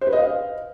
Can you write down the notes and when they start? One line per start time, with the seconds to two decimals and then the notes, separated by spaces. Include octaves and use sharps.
0.01 C5
0.07 B4
0.13 D#5
0.18 F5